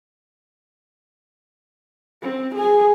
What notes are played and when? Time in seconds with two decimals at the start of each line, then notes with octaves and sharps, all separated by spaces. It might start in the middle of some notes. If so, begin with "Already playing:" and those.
2.23 C4
2.55 G#4 G#5